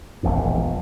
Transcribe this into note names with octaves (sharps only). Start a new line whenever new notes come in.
E1 A#1 F2 A#2